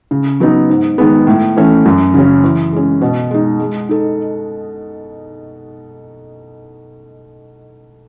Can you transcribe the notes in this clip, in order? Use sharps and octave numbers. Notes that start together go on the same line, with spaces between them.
C#3
F#3 B3 D#4
G#2
D#3 G#3 B3
A2
E3 A3 C#4
F#2
C#3 F#3 C#4
E3
G#3 C#4
B2
G#3 D#4
G#3
D#4 A4